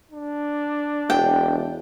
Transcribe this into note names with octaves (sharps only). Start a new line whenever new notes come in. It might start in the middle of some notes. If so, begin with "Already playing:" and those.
D4
E1 G5